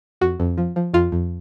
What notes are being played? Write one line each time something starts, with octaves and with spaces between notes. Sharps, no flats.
F2 F#4
F2
F3
F3
F2 F4
F2